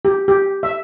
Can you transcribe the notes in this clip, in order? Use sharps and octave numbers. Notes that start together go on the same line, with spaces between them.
G4
G4
E5